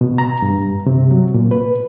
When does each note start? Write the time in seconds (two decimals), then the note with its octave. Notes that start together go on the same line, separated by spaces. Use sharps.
0.01 B2
0.18 A#5
0.42 G2
0.86 C3
1.11 F#3
1.34 A#2
1.51 B4